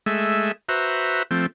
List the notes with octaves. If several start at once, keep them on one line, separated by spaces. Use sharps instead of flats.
G#3 A3 E5
F#4 B4 C5 E5 A#5
F3 A3 C4